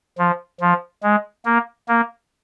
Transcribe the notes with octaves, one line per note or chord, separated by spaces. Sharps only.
F3
F3
G#3
A#3
A#3